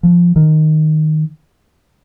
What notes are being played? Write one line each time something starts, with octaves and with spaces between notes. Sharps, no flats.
F3
D#3